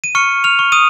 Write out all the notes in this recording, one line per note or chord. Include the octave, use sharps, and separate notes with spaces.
D#7
C#6 F6 C#7
F6 F7
C#6
D#6 D#7